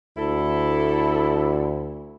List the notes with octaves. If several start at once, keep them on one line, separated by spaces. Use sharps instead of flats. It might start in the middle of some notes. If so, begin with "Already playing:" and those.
D2 E4 A4